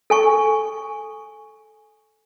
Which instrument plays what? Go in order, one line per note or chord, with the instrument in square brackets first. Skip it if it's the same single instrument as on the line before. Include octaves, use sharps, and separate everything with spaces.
[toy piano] A4 G#5 C#6